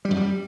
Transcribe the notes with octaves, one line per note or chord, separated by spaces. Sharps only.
G3
F#2
G3